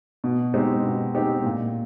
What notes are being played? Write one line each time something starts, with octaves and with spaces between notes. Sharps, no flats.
B2
G#3 C4 D#4 G4
B2
G#3 C4 D#4 G4
A#2